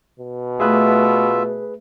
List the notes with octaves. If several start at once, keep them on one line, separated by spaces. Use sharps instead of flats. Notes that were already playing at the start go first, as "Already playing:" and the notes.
B2
A3 F4 G#4 B4 E5